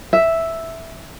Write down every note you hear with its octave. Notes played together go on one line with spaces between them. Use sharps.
E5